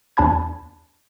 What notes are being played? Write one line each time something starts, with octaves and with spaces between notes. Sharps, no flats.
E2 D4 A5 B5 G#6